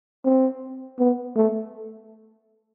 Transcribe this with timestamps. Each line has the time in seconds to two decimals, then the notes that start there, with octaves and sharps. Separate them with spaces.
0.25 C4
0.99 B3
1.36 A3